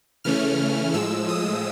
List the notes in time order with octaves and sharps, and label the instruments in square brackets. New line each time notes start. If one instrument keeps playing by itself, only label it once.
[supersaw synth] C#3 E3 A3 C#4 F6
A2 F3 G#3 E6
D#6